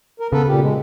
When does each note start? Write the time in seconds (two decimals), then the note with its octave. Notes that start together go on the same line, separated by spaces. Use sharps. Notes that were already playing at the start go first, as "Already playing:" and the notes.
0.20 A#4
0.32 C#3 B3 A4 B4
0.48 A#2 G4
0.62 G#3